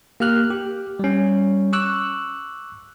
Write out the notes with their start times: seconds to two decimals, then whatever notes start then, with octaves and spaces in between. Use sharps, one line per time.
0.20 A#3 G4 F6 F#6
0.50 G4
0.99 G3 C#4
1.73 C#6 D6 E6 F#6